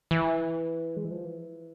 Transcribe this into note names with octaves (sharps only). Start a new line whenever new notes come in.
E3
G#3
E3
F3
E3